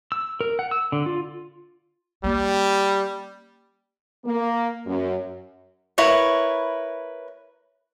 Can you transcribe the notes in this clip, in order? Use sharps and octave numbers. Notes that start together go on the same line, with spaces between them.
E6
A#4
F#5
E6
D3
F4
G3 A#3 C#4
A#3
F#2
E4 A#4 B4 C#5